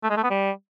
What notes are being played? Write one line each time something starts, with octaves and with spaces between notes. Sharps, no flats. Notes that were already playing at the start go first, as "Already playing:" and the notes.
A3
G#3
A3
B3
G3